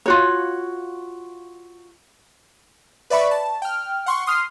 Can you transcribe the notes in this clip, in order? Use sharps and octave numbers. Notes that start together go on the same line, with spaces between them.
F4 F#4 C#5
B4 D5 E5 B5 C#6
A5
G5 F6
F#5 C6 C#6
C6 D#6 F6 C7